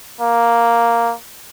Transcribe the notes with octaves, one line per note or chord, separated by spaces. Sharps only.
A#3